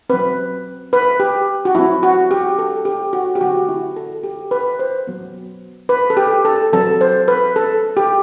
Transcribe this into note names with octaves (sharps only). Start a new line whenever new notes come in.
F#3 C4 B4
B4
G4
F#4
F#3 C4 E4
F#4
G4
A4
G4
F#4
G4
D3 F#3 A3 C4 F#4
E4
A4
G4
B4
C5
F#3 B3
B4
A4
G4
A4
F#3 C4 A4
C5
B4
A4
G4